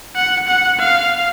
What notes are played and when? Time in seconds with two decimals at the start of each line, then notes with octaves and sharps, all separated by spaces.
0.16 F#5
0.48 F#5
0.79 F5